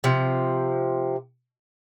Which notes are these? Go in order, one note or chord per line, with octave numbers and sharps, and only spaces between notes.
C3 F3